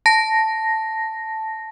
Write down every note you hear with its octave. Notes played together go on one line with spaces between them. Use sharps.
A5 A#6